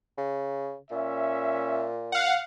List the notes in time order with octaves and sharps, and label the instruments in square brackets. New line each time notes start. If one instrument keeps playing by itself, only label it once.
[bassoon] C#3
[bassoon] A#2 [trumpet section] C#4 E5
[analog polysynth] F5 F#5